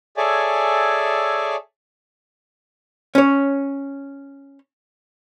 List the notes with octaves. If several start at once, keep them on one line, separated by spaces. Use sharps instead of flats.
G#4 A4 C#5 D5 E5 G#5
C#4 C#5